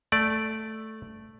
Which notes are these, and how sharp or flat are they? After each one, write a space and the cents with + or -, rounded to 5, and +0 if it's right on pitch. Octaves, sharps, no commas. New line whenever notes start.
A3 +0 D5 +0